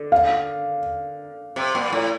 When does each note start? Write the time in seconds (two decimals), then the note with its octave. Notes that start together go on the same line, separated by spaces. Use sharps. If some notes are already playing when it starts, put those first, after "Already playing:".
Already playing: D3
0.12 F5
1.56 C3
1.75 A#2
1.92 A2